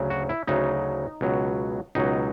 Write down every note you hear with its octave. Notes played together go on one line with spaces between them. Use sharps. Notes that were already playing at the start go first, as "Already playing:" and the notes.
Already playing: D2 C#3 F#3
F#4
E4
D2 C#3 F#3 D#4
C#2 B2 F#3
C#2 B2 F#3 D#4